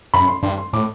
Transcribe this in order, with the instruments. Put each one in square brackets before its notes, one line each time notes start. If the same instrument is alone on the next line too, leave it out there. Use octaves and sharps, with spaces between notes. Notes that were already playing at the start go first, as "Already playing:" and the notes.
[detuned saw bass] F#2 [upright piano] B5
[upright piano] C6
[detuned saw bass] G2 [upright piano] C6
[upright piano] C6
[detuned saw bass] A2 [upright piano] D6